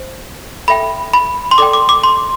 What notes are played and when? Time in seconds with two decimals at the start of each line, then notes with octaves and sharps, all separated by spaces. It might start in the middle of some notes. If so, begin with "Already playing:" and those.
Already playing: C5
0.68 A4 E5 G5 B5
1.13 B5
1.51 C6
1.58 A4 D5 G5 D6
1.73 D6
1.89 D6
2.04 C6